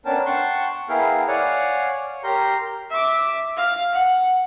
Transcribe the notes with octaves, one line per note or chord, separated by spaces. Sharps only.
B3 C#4 D4 A#4 G5 A5
F#5 G5 A5 C6 C#6
B3 E4 G#4 A#4 F5 G5
C#5 D5 F5 F#5 G#5
C#5
G4 A#4 A#5 C6 G6
E5 D6
F5
F#5